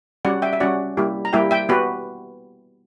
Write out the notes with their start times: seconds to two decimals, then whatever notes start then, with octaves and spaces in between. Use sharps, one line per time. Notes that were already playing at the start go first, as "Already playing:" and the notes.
0.25 G3 C#4 F#4 D5 F#5
0.42 E5 G5
0.53 E5
0.60 G3 C#4 F#4 D5 F#5
0.97 G3 A#3 E4 G4
1.25 A#5
1.33 G3 A#3 E4 G4 E5 G5
1.51 E5 G5
1.69 B3 F#4 G4 B4